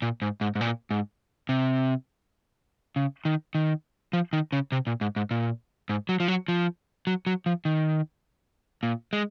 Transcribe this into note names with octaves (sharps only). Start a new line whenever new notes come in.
A#2
G#2
G#2
G#2
A#2
G#2
C3
C#3
D#3
D#3
F3
D#3
C#3
C3
A#2
G#2
G#2
A#2
G#2
F#3
F3
F#3
F3
F#3
F#3
F3
D#3
A#2
G#3